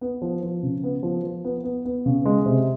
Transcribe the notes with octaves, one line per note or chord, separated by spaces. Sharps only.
B3
F3
F3
C#3
B3
F3
F3
B3
B3
B3
C#3
G#3
C3